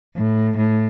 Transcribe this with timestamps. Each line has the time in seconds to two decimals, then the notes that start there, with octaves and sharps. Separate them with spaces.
0.16 A2
0.57 A2